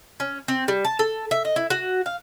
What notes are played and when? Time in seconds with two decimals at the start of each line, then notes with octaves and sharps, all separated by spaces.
0.20 C#4
0.48 C4
0.68 G3
0.85 A5
0.99 A4
1.31 E5
1.45 D#5
1.56 E4
1.70 F#4
2.06 F5